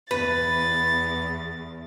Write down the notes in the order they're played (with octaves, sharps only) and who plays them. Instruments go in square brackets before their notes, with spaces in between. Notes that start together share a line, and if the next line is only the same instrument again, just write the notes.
[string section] E2 [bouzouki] B4 [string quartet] A6